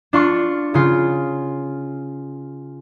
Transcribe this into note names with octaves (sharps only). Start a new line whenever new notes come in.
D4 F4 C#6
C#3 F4